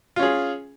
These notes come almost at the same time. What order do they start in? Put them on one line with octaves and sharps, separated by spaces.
F4 C#4 G#4